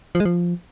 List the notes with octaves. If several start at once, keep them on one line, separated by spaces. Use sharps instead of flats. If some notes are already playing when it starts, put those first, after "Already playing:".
F3
G#3
F3